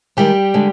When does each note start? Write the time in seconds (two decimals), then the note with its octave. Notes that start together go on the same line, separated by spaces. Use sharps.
0.17 D#3 G3 G#3 G4
0.54 D3 G#3